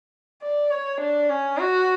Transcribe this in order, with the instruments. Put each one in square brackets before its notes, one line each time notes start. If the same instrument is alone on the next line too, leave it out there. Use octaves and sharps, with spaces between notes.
[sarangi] D5
C#5
D4
C#4
F#4